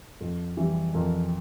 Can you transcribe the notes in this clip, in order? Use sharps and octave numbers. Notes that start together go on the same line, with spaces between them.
F2
E3 G3
F2 A#4